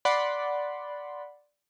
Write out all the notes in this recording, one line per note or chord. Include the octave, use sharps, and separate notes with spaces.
D5 F#5 B5 C6